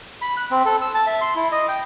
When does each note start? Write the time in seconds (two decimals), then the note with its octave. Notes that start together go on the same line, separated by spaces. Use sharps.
0.22 B5
0.37 F#6
0.51 C4
0.66 A4
0.82 E6
0.95 A5
1.07 E5
1.21 C6
1.36 E4
1.52 D#5
1.68 G5